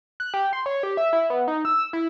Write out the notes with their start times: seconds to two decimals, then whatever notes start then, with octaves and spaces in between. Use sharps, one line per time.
0.20 F#6
0.34 G4
0.53 C6
0.66 C#5
0.83 G4
0.97 E5
1.13 E4
1.30 B3
1.48 D#4
1.65 E6
1.93 E4